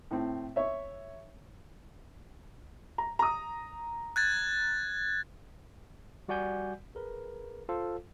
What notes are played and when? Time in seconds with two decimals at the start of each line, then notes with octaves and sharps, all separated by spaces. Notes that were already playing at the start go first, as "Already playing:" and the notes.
0.11 A2 C4
0.56 C#5 E5
2.98 A#5
3.19 A#5 D#6
4.16 F#6 G#6 A6
6.28 G3 F#4 D5 F#5 G#5 G6
6.95 G#4 A#4 B4
7.69 F4 A4 C5 F5